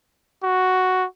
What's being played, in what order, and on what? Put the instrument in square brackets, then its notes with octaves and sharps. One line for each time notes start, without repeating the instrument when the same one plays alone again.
[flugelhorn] F#4